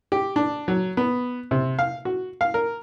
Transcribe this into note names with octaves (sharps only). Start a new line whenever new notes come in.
G4
D4
F#3
B3
C3
F5
F#4
F5
A#4